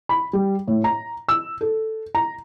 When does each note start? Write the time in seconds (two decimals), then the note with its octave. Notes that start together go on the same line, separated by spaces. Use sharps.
0.09 B5
0.33 G3
0.67 A2
0.84 A#5
1.28 E6
1.61 A4
2.15 A#5